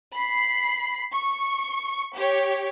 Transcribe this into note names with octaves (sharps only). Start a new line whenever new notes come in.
B5 C7
C#6
G4 C#5